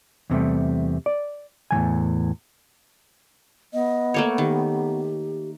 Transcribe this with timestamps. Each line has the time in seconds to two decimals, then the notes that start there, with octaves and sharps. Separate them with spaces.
0.30 E2 C3 G3 A3
1.06 D5
1.71 E2 A2 E3 G#5
3.73 B3 D#5
4.14 A3 A#3 C#5
4.38 D#3 G4